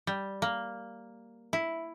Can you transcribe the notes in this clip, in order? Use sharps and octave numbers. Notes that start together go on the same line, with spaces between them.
G3
A#3
E4